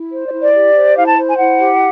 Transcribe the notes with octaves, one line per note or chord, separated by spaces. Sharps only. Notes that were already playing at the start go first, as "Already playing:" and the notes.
Already playing: E4
C5
D5
E4
D5
G4
C5
E4 F5
A5
C5
G#5
E4 F#5
G4